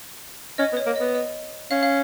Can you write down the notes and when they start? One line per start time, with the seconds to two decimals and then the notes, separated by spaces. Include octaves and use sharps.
0.58 C#4 D#5
0.73 B3
0.77 C#5
0.86 A#3
0.96 B3 D#5
1.15 D#5
1.71 C#4 F5
1.83 F5